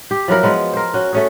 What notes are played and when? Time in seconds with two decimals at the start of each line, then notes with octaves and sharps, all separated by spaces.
0.11 G4
0.28 F3 F#3 E4 A#4
0.43 F3 G#3 B3
0.73 A#4 C5
0.94 C#4 F#4
1.13 A3 C#4 G#4